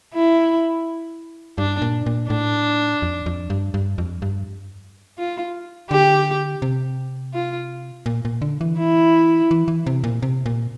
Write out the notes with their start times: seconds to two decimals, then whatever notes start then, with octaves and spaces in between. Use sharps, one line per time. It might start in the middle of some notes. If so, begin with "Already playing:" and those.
0.14 E4
1.58 G2 D4
1.82 A#2
2.06 A#2
2.30 A2 D4
3.02 F2
3.26 F2
3.50 G2
3.74 G2
3.98 F2
4.22 G2
5.18 F4
5.91 D3 G4
6.62 C3
7.34 F4
8.06 A#2
8.25 A#2
8.42 D3
8.61 E3
8.78 E4
9.51 E3
9.68 E3
9.86 C3
10.04 A#2
10.22 C3
10.46 A#2